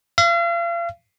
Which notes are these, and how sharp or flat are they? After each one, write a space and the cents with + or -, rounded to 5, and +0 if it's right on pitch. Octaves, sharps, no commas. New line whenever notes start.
F5 -40